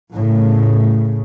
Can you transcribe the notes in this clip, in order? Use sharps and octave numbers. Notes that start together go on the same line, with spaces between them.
A2 C#3